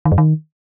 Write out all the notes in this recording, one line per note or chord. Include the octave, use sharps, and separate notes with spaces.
D#3
F#2
D#3